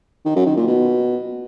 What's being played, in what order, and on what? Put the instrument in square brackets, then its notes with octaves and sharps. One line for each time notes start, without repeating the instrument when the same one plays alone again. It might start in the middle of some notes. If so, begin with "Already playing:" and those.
[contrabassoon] D#3
F#2
D#3
A#2
B2